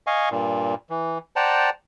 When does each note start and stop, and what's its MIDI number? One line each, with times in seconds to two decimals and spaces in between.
0.07 0.29 75
0.07 0.29 77
0.07 0.29 80
0.07 0.29 85
0.30 0.75 43
0.30 0.75 46
0.90 1.18 52
1.36 1.70 72
1.36 1.70 74
1.36 1.70 78
1.36 1.70 79
1.36 1.70 81
1.36 1.70 82